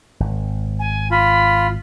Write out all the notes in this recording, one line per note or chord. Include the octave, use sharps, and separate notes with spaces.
G#1
G#5
F4 B5